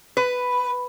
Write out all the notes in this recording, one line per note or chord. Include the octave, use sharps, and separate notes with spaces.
B4